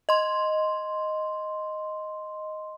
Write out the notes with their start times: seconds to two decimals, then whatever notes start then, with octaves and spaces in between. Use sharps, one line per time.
0.09 D#5 C6